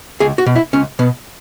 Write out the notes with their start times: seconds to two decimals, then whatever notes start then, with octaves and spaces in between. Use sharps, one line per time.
0.20 C#2 G#4
0.38 F#4
0.46 B2
0.56 E4
0.73 C#2 C#4
0.99 B2 B3